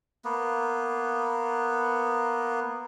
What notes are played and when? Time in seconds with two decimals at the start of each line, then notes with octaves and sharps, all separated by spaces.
0.25 A#3 B3